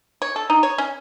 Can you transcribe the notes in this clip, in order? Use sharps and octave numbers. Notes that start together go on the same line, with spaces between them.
C#5
A4
D#4
C#5
C#4